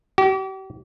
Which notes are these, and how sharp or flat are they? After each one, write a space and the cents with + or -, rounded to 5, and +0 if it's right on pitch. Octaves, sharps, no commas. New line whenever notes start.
G4 -40